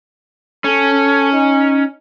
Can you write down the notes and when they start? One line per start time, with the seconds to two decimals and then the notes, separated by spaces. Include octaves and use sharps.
0.64 C#4 A4
1.33 D#4